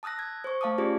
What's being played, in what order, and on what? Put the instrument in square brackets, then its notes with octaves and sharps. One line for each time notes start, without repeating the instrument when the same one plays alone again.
[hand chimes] A5 D#6 E6 F#6 A#6
G#6
C5 C#6
A3 F5 A5 D6 D#6
C#4 F4 G4 G#4 D5